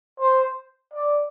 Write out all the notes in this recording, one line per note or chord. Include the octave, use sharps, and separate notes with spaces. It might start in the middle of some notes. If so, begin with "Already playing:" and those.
C5
D5